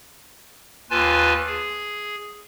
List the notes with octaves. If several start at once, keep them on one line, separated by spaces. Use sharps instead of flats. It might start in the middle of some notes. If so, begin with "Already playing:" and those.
D#2 F4 B4 G#5 A5
G#4